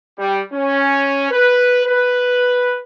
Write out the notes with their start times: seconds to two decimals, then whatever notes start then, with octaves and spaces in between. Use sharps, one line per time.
0.19 G3
0.53 C#4
1.31 B4
1.86 B4